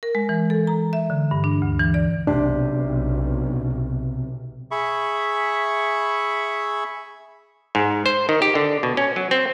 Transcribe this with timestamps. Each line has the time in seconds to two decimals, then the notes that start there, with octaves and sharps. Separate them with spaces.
0.03 A#4
0.15 G#3
0.29 E3
0.50 A4
0.67 A#5
0.93 E5
1.10 D3
1.31 G2
1.44 D4
1.62 D2
1.80 E3
1.94 D5
2.27 B1 C3 D4
4.71 G#4 E5 B5 C#6
7.75 G#2
8.06 C5
8.29 D#3
8.42 G4
8.55 D3
8.83 B2
8.97 C#4
9.16 F#3
9.31 C4